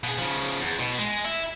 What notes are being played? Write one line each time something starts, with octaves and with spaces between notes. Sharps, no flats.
B2 G#4
C#3 F3
E2
B2
G#3
E4